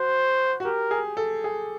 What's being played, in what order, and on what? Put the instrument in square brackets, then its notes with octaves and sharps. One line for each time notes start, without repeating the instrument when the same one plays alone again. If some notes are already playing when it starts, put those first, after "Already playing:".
Already playing: [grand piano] F#4 [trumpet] C5
[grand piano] F#4
[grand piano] G4 [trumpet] A#4
[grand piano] G#4
A4
G#4